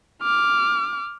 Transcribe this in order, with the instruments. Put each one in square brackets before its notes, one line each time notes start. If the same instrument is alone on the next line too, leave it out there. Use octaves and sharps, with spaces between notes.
[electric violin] D6 F6